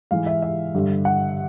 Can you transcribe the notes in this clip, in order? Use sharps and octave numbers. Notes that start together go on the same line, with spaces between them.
G#2 E3 G#3 F5
E5
E5
G2 D3 G3
F#5